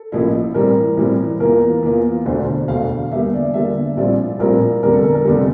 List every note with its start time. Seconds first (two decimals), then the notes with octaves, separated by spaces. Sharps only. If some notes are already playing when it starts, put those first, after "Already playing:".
Already playing: A4
0.12 A1 A2 F3 A#3 E4
0.54 A2 E3 G3 C4 A#4
0.97 A2 E3 G3 C4
1.40 E2 E3 A#3 F4 A#4
1.83 E2 E3 A#3 F4
2.25 E1 D2 D3 A3 C5
2.39 C5
2.68 E1 D2 D3 A3 F5
3.12 E2 D3 G3 A#3 E5
3.33 D5
3.54 E2 D3 G3 A#3 E5
3.97 A#1 A2 G3 C4 F4 D5
4.39 A#1 A2 G3 C4 F4 A#4
4.83 F1 E2 D3 G3 A#4
4.93 A4
5.04 A#4
5.15 A#4
5.25 F1 E2 D3 G3 A4